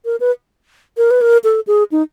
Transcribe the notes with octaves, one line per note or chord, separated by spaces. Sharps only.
A#4
B4
A#4
B4
A#4
A4
G#4
D#4